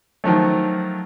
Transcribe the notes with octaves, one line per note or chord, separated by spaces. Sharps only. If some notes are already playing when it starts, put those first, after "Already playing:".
D#3 F3 F#3 A3